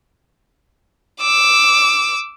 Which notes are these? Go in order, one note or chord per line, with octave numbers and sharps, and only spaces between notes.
D6 E6